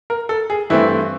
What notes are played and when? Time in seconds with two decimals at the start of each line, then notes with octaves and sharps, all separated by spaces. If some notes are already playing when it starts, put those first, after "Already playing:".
0.10 A#4
0.29 A4
0.50 G#4
0.70 G2 E3 A3 C4 E4